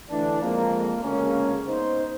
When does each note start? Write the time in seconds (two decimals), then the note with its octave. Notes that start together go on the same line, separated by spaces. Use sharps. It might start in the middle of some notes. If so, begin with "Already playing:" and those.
0.11 D3 E3 A3 D4
0.41 F2 F3 G#3 A#3
1.03 D2 C#3 G#3 A#3 C#4
1.68 B3 D#4 C5